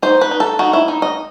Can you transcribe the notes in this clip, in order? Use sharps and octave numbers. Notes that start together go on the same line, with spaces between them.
D#4 C5
B4
D#4
A4
D#4 F#4
E4
D#4
D#5